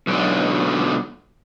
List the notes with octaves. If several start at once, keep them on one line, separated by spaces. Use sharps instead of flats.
B1 D3